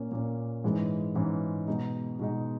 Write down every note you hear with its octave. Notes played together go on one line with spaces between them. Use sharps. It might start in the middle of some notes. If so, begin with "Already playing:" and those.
Already playing: A#2 A#3 C#4
A#2 A#3 C#4
G#2 E3 G#3 C#4
G#2 E3 G#3 C#4
B2 G#3 D#4
B2 G#3 D#4